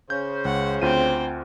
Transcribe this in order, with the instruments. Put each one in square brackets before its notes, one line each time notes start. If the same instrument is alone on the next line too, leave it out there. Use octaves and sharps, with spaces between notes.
[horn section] C#3 C#4 C5 [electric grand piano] G6
[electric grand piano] C#2 [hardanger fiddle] F#5
[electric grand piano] D2 F4 D#7 [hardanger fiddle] C4